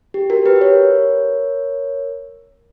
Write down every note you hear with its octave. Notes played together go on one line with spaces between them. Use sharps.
G4
F#4 A#4
G4 B4
B4
A#4 C#5